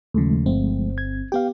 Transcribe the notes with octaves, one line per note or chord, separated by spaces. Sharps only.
D#2 C#3 F3 G#3 A3
G1 C4
G#6
B3 G4 F5 G5